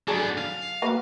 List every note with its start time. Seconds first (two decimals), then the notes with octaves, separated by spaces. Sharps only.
0.08 F#3 B3 D4 G#4 A4
0.38 F5
0.82 A#3 F#4 B4